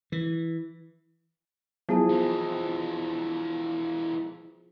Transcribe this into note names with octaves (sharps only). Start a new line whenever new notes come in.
E3
F3 F#3 B3 E4 G#4 A5
E3 G#3